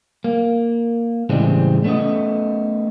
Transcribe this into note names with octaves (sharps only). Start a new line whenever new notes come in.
A#3
A2 C#3 E3 G3 G#3 C4
A3 B3 C#4 A4 D#5